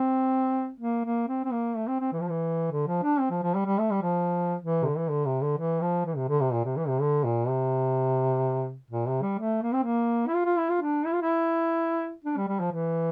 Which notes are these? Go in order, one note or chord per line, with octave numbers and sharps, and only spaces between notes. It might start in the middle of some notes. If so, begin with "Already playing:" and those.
Already playing: C4
A#3
A#3
C4
C4
A#3
A3
C4
C4
E3
F3
E3
D3
F3
D4
C4
F3
F3
G3
G3
A3
G3
F3
E3
C3
D3
E3
D3
C3
D3
E3
F3
E3
C3
D3
C3
A#2
C3
E3
C3
D3
A#2
C3
A#2
C3
G3
A3
A#3
C4
A#3
E4
F4
F4
E4
F4
D4
E4
F4
E4
D4
G3
G3
F3
E3